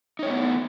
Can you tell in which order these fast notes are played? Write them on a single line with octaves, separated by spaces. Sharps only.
D#4 C#5 A3 B3 E4